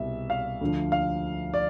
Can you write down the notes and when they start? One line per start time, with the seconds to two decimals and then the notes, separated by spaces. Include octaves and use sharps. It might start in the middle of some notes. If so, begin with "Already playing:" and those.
Already playing: C2 B2 G3 E5
0.30 F5
0.61 D2 D3 F3
0.92 F5
1.54 D5